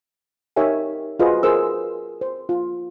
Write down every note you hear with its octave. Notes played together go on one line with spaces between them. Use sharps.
D#4 G4 A#4 C#5 E5 G#5
F4 F#4 G#4 B4 C5 D#5
G#4 A#4 C5 E6
C5
F4